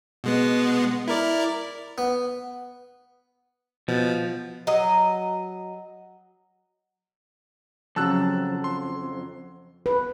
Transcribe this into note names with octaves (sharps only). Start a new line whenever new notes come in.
B2 G#3 B3
E4 A#4 D5
B3
B2 F3
F#3 D#5
F2 C#3 F#3 A5 E6 F#6
C6
B4